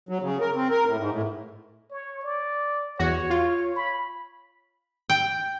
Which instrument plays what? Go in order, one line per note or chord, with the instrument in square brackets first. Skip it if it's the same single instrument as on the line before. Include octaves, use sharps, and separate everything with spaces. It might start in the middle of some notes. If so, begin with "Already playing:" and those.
[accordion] F#3
C#3
A#4
C4
A#4
A2
G#2
A2
[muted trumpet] C#5
D5
[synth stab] E2 F#4 [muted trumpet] C#5
[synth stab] F4
[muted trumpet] B5
[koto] G5